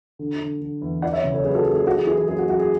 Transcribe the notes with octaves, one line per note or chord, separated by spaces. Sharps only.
D3
D3
D3
E2
E3 D5 F#5
C#5 E5
C#3
A4 C#5
F#2 G#4 B4
F#4 A4
F#2 G#4
G#4
E3 F#4 A4
G#4
E3 G#4
G#4
F#2 G#4
F#4
F#2 F#4
G#4